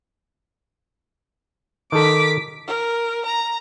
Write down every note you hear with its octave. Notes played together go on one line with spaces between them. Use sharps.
D#3 A4 D6 B6
A#4
A#5